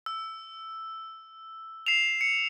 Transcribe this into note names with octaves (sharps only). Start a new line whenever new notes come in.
E6
C7 E7 F7
C#7